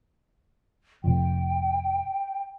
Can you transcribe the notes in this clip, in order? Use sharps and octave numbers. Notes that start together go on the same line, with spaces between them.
F1 C3 F3 G5